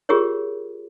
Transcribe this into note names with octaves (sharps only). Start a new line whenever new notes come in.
F4 G4 G#4 A#4 C#5